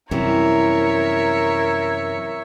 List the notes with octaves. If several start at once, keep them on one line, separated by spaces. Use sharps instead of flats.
F#2 C3 E3 G3 C4 A#4 C#5 E5